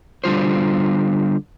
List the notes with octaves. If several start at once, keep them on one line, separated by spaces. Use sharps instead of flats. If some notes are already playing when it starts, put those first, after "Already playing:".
D3 G3 F4 C5